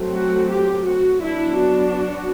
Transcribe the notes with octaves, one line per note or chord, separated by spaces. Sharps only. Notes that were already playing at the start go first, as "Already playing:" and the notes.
Already playing: F#3 A3 C4
F#4
G4
F#4
F#3 B3 D4 E4
F#4